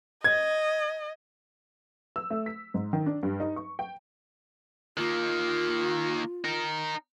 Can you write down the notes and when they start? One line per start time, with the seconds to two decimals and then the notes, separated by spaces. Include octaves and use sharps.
0.24 D#5 G#6
2.16 E6
2.30 A3
2.46 B6
2.74 G#2
2.93 D#3
3.06 D4
3.23 G2
3.40 D#4
3.56 C#6
3.79 G5
4.97 D#3 A#3 F4
6.44 D#4 A#4